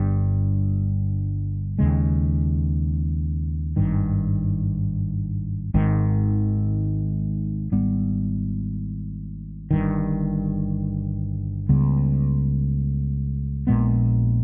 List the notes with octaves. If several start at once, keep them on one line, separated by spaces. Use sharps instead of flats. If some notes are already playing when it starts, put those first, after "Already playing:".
Already playing: G1 G2 G3
D#2 C#3 G#3
G#1 G2 D#3
G#1 G#2 D#3
G#1 G#2 G3 B3
G1 G2 D#3
C#2 C#3 G3 B3
A#1 A#2 G#3 B3